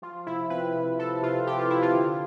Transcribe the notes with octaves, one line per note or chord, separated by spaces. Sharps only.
F3 F4
C3 E4
C4 B4
C3
F3 A4
C3 F4
C4 G4
F4
C3 E4
F4
D3